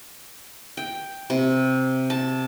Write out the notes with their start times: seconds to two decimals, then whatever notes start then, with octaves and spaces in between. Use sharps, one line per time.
0.77 G5
1.30 C3
2.10 A5